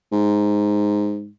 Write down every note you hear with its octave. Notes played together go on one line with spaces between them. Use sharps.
G#2